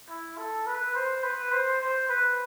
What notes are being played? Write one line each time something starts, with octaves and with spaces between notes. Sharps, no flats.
E4
A4
B4
C5
B4
C5
C5
B4